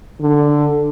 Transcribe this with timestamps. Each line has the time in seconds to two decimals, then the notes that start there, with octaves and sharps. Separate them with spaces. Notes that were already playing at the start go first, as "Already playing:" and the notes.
0.21 D3